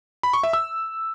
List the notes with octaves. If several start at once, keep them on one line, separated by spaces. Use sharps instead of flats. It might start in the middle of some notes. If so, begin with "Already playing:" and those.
B5
C#6
E5
E6